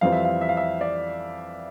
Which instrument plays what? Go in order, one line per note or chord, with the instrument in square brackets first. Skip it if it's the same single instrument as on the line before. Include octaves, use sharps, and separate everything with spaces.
[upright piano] F2 E3 G3 C4 F4 [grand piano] F5
[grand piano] E5
F5
E5
F5
E5
D5